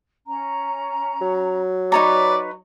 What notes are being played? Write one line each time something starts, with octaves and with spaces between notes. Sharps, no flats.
C#4 A#5
F#3
D#4 B4 C#5 D5 A#5